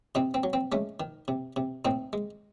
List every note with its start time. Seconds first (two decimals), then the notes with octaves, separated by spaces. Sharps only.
0.15 C3 C4 D#4
0.34 C4
0.43 F#3
0.53 C4
0.72 G#3 A3 C#4
1.00 D#3
1.28 C3
1.56 C3
1.85 A2 C4 D#4
2.13 G#3